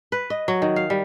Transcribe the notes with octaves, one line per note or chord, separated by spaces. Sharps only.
B4
D#5
F#3
D#3
F5
G3